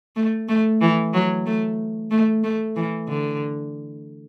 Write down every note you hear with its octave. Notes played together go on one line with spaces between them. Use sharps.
A3
A3
E3
F#3
A3
A3
A3
E3
D3